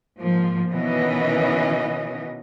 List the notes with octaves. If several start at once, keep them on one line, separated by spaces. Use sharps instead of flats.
G#2 F3 A#3
B2 D#3 E3 B3 C#4 D#5